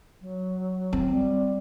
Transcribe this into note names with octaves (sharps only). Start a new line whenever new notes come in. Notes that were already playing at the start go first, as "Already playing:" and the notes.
F#3
C4
G3